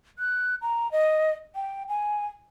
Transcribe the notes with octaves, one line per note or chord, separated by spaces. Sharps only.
F#6
A#5
D#5
G5
G#5